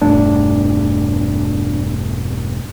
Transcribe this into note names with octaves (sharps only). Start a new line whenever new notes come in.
E1 G2 A3 D4